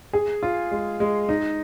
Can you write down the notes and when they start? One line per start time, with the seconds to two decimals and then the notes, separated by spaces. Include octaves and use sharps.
0.13 G#4
0.43 F4
0.71 G#3
1.00 G#3
1.29 D#4